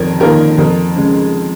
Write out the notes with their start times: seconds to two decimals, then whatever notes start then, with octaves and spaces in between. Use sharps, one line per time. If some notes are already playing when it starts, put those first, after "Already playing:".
Already playing: F2 D#3 A#4 C#5
0.20 D#3 A#3 F4 A#4
0.58 F2 A#4
0.96 C#3 G#3